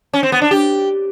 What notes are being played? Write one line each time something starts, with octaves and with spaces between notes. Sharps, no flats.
C#4
C4
B3
D4
G4